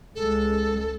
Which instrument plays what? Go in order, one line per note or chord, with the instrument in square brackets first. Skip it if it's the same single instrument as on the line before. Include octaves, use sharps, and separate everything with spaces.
[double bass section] C#2 G#3 [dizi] A4